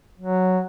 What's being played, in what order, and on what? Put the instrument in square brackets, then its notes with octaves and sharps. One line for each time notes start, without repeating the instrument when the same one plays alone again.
[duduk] F#3